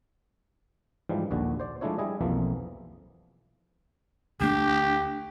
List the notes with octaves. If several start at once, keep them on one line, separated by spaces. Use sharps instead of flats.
G#2 E3 F3 G3
A#1 D#2 D3 F#4
C5 D5
F3 G#3 A3 D4 E4 C#5
G3 E4 G#4 D#5
B1 F2 E3 F3 A#3
D2 A3 D4 G4